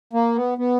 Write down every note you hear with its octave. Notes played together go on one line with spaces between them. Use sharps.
A#3
B3
B3